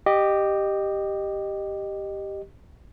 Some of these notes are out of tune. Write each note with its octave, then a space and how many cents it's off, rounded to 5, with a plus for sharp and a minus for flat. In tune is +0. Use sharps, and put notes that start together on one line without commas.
G4 +0 D#5 -20